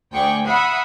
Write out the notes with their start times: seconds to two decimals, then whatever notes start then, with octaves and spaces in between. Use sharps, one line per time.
0.11 D2 G#4 G5 C#6 D6
0.46 E5 F#5 B5 D#6 C7